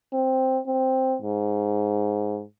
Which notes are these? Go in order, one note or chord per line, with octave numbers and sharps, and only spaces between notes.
C4
C4
G#2